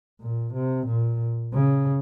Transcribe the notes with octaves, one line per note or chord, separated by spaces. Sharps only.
A#2
C3
A#2
C#3